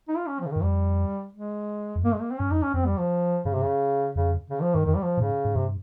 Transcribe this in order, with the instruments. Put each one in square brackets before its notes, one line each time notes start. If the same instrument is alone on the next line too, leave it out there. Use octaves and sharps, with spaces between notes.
[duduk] D#4
F4
C#4
F3
C#3
[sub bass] G2 [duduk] D#3
[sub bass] F2 [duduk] G3
[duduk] G#3
[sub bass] F2
[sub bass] G2 [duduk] A#3
[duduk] G#3
A#3
C4
[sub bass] G2 [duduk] C#4
[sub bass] F2 [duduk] D#4
[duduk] C#4
[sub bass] F2 [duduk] C4
[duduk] G3
F3
[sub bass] G2 [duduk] C#3
[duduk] C3
C#3
[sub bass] F2 [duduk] C#3
[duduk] C#3
F3
[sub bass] G2 [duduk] D#3
[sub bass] F2 [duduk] D#3
[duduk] G3
F3
[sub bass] A#2
[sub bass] G#2 [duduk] C#3
[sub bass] G#2
[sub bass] G2 [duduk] C3